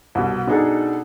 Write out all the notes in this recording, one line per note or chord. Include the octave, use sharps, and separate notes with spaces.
C2 B2
B2 D4 D#4 G#4 A4